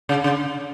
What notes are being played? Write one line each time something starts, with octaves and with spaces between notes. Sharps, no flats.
C#3
C#3